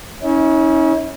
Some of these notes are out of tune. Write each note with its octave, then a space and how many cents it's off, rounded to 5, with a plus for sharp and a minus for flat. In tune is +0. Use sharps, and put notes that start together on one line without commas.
C#4 +0 E4 -45